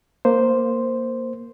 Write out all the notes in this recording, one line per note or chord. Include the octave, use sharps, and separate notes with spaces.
A#3 C5